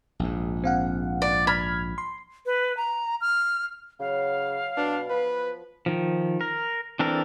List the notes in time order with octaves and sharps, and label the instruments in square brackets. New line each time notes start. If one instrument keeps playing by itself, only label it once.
[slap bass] A#1 G#2
[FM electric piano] C4 F5 F#5
[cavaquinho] D5
[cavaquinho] B5 [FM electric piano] F6 G#6
[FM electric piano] C6
[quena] B4
A#5
F6
[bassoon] C#3 [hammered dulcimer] F#3 B4 [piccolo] F5
[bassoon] B2 [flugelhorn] D4
[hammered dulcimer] F3 [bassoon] B3 [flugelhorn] B4
[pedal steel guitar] D#3 F3
A#4
E3 C4 D4 A4 A#4